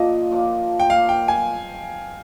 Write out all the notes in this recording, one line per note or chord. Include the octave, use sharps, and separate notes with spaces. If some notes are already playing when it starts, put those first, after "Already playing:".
Already playing: A#2 F3 A#3 D#5
A#2 F3 A#3
G5
A#2 F3 A#3 F5
G5
G#5